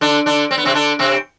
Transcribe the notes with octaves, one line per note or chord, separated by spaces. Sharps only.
D3 D4
D3 D4
C4
B3
C3 C4
D3 D4
C3 C4